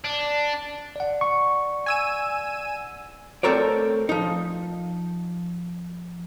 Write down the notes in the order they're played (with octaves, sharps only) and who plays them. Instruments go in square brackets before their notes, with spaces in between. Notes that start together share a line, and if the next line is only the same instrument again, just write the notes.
[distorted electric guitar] D4
[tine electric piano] D5 F#5
[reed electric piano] C#6
[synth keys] G#5 E6 D#7
[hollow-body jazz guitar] A3 C4 A4 A#4 C#5 D5
F3 D#4